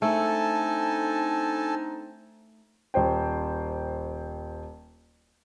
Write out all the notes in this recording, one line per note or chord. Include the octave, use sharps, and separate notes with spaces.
A3 C4 D4 D#4 A4 G#5 A5
D#1 C5 G5